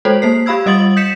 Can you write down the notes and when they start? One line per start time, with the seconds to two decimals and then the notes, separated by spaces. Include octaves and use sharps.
0.05 G#3 A4 C5 C#5
0.22 A#3 C5 C7
0.46 G4 F5 B5 E6 G#6
0.66 G3 D#5 D#6 A6 F#7
0.97 G6 B6 C#7 E7